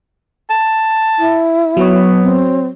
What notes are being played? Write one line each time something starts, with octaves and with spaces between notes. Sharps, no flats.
A5
E4
F#3 B3 C#5
C4